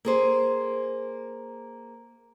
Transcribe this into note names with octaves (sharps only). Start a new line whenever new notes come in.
A#3 G#4 C5